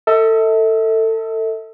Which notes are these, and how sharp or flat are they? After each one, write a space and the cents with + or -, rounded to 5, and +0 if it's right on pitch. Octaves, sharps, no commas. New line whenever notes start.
A4 +25 E5 -45